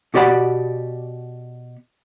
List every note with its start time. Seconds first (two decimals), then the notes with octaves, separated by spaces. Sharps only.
0.14 B2 F#4 G4 D5 F#5 B5